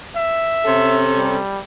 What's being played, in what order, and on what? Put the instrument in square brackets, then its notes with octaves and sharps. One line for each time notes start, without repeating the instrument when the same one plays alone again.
[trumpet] E5
[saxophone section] C3 C#4 A4
[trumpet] G3